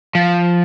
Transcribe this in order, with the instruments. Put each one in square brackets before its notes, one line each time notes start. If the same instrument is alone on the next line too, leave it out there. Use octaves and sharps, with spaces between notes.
[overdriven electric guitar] F3